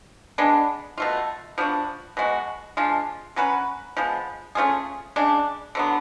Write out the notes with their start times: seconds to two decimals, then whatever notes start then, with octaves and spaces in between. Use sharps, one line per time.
0.38 G#3 B3 D4
0.98 B2 A3 F4
1.58 F3 B3 D4 F#4
2.17 B2 G#3 D4 F#4
2.77 F3 G#3 D4 F4
3.36 F#3 C#4 F#4 B4
3.97 F3 G#3 B3
4.55 A3 C#4 F4 G#4
5.16 C#3 G#3 D4
5.75 D3 F#3 B3